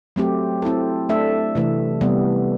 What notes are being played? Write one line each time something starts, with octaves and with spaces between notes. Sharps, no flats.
F#3 A3 C4 G4
C4 E4 A4
A3 D4 A4 E5
C3 E3 A3
C3 G3 B3